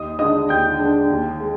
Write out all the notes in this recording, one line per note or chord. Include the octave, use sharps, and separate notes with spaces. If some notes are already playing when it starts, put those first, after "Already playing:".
Already playing: D#2 D#5 D#6
D3 G#3 D4 D#5 D#6
D#2 G5 G6
D3 G#3 D4
D#2
G#3